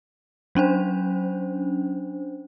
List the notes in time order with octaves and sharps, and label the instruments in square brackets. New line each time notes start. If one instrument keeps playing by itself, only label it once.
[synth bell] F#3 C#4 D4 C5